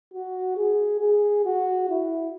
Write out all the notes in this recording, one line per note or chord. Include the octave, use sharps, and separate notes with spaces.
F#4
G#4
G#4
F#4
E4